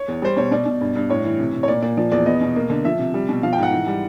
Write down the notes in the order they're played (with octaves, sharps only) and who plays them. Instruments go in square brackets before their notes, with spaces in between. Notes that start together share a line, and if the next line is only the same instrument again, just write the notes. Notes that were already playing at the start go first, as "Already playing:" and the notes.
Already playing: [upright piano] C#5
E2
G3 C5
B2 C#5
B2 D5
B2
G2
G2
A2 C#5
E3
C3
C3
C#5
A#2 D5
A#2 D5
F3 D5
E2 D5
B3 D#5
B2
A#3
D3
F3 E5
C3
G3
B2
F3 F5
G5
G#2 F#5
E3
G3